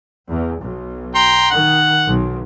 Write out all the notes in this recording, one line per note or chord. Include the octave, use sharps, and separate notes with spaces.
E2
B1
G5 A#5 C6
D#3 F#5
B1